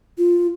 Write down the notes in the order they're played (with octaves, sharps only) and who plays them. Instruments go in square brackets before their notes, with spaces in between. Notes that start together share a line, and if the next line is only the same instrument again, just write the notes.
[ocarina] F4